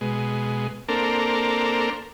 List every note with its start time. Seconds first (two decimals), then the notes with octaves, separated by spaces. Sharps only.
0.01 B2 G#3
0.88 A#3 C4 D4 A4 A#4